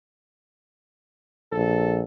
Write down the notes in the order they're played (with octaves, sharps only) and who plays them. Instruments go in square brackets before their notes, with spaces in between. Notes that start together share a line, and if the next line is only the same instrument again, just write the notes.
[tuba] A#1 [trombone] A4